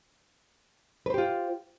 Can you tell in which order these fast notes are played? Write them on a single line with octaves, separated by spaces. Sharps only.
B4 C5 G4 F4